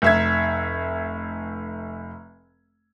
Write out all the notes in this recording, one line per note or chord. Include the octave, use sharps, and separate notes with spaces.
F1 E5 G#6